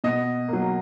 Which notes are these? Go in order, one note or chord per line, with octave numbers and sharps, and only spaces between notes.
B2 D#5
F#3 A#3